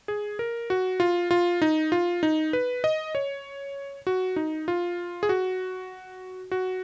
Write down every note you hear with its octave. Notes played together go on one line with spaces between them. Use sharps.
G#4
A#4
F#4
F4
F4
D#4
F4
D#4
B4
D#5
C#5
F#4
D#4
F4
G#4
F#4
F#4